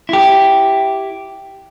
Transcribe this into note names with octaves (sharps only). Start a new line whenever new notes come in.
E4 G4